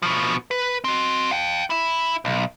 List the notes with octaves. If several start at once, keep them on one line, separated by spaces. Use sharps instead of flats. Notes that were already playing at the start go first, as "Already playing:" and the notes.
B2 F3
B4
C4 F#4
F5 G5
E4 E5
B1